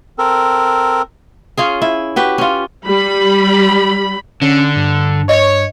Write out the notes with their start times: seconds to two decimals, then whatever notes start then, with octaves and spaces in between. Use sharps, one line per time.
0.18 C4 A4 A#4
1.57 C#4 F4 G#4
1.82 E4
2.16 F#4 G4 B4
2.38 C#4 F4
2.84 G3 B5
4.42 D3 C#4
4.76 G2
5.29 C#5 D#5